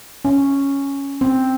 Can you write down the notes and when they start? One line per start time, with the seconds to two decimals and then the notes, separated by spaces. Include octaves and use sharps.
0.25 C#4
1.21 C4